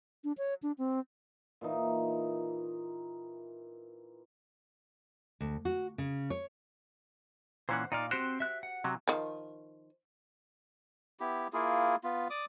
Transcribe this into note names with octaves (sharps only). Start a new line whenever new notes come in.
D4
C#5
D4
C4
A#2 E3 D#4
D2
F#4
C#3
C#5
A#2 E3 C#4 C5 F#5
A#2 D#4 D5 F5
C4 F#4 G4 C5 C6 F#6
E5 F#6
F#5
C3 F#3
D#3 F3
B3 E4 G4
A#3 E4 F4 G#4
B3 F4
D5 D6 D#6